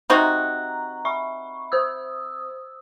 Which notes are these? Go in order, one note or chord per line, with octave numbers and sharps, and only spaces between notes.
C3 D#4 F#4 A#5
E5 B5 C#6
C5 D#6 E6